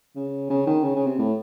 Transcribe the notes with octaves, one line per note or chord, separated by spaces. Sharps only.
C#3
C#3
D#3
C#3
C#3
C3
A2